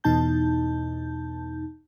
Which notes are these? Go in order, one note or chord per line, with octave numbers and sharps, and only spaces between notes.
E2 B2 D#4 A5 G6